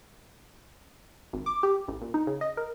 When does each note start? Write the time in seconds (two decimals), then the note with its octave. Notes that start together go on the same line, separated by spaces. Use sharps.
1.33 G#1
1.46 D6
1.63 G4
1.88 A1
2.01 A#2
2.14 D#4
2.27 C#3
2.41 D#5
2.57 A#4